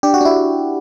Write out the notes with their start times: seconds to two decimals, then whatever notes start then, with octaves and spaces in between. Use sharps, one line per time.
0.03 D4 G4
0.14 F#4
0.21 D4 E4